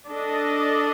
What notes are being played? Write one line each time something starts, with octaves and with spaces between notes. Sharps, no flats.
D4 A4 D#5